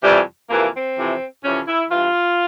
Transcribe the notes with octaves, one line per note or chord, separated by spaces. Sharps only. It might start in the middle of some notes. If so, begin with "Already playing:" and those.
F2 C3 E3 G3
F2 C3 E3 A#3
C4
F2 C3 E3
F2 C3 E3 C#4
E4
G2 E3 F4